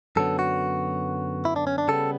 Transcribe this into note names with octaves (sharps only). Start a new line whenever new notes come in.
F#2 D3 F#3 B3 A4
F#4
E4
D4
C#4
D4
C#3 G3 B3 A4